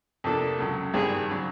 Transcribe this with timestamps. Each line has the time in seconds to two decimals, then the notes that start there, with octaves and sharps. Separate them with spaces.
0.24 F2 C3 F3 A#3 D4 A4
0.59 C#2 C#3 F#3
0.93 G#1 G2 D#3 G3 C4 G#4
1.30 C#3 F#3